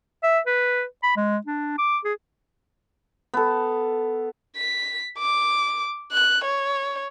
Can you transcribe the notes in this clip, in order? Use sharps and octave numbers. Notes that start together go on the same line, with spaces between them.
E5
B4
B5
G#3
D4
D6
G#4
B3 A4
B6
D6
F#6
C#5